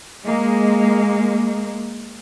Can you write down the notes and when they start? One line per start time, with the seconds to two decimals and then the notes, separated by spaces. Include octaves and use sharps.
0.25 G#3 A#3